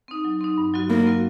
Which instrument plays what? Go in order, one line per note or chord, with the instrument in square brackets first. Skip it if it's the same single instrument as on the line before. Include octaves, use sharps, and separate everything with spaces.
[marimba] C4 D#4
F#3
C4 D#4
G2
F#3 C4 F#4
[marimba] G2 [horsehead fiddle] A#3
[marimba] F#3 C4 F#4